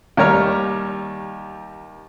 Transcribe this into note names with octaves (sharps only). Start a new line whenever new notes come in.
D#2 G3 G4 C#5 A#5 F6